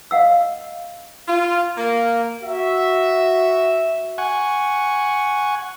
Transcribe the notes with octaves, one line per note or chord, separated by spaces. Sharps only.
D#5 F5 F#5 E6
F4
A#3
F#4 E5
F#5 G#5 C#6